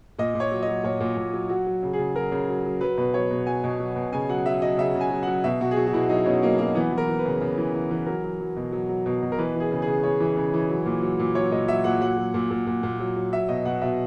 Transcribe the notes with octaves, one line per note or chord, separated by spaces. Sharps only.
A#2 D#5
A#2
C#5
F#3
D#5
F#3
A#2 C#5
A#2
A#2
F#3
F#3 F#4
F#3
C#3
G#4
C#3
F#3 A#4
C#3
F#3
F#3
F#3 B4
B2 B4
F#3 C#5
B2
F#3 G#5
B2
F#3
B2
C#3 G#5
F#3 F#5
F#3 E5
F#3 D#5
C#3 E5
C#3
G#5
F#3
F#3 F#5
B2 E5
B2 F#4
G#4
F#3 F#4
F#4
B2 E4
F#3 D#4
B2 C#4
F#3 A#3
F#3 A#3
E3 B3
E3
A#4
E3
B4
C#3
C#3
E3
E3
E3
F#3 A#4
F#3
F#3
B2
F#3
F#3
B2
B2
A#4
E3 B4
E3 G#4
C#3
G#4
C#3
C#3 C#5
E3
C#3
E3
F#3
A#2
F#3
A#2
F#3 C#5
A#2 D#5
F#3 E5
A#2 F#5
F#3 F#5
F#3
A#2
A#2
A#2
A#2
F#3
F#3
F#3 E5
B2 D#5
B2 F#5
B2 E5